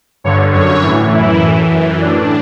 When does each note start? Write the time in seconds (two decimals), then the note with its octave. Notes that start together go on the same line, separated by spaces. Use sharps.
0.24 G2 D3 C#5
0.54 F#2 D3 C#5
0.83 A2 E3
1.12 F#2 E3 E4
1.41 A2 E3
1.71 F#2 E3
2.00 A2 E3 D4